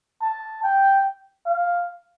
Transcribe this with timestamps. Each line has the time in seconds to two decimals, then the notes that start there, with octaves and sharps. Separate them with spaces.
0.22 A5
0.63 G5
1.46 F5